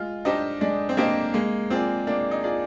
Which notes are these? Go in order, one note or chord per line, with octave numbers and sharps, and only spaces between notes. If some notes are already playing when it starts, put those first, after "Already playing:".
Already playing: G#3 F4
D4 D#4 G4 C5 D#5
G#3 D4
C4
A#3 D4 G4 C5 D#5
G#3 A#3
C4 F4 G#4 D5
A#3 D4
D#4
F4 G#4 D5